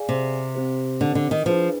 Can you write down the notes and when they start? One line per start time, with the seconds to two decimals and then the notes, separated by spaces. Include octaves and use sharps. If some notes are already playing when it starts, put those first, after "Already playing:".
Already playing: G#4 D5 F5 G#5
0.09 C3
0.55 C4 G4 C5
1.01 D3
1.15 D3
1.31 D#3
1.45 F3 D4 G#4 B4